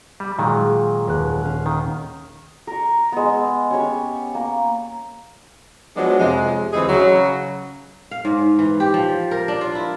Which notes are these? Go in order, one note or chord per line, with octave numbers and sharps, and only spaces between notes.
G3
A#2 D#3 F#3 G#3
D#1 B4 F#6
C#4 F5
D#3
A#4 C#6
G#3 B3
E6
C#4 G4 C#5 C#6
A#3
F3 F#3 G#3 B3 D4
F2 C3 G#3
D2 E3 C4 D#4 G#4
C#3 F#3
F5
G#2
E3
G4
F3
A#4
D4
F4
E4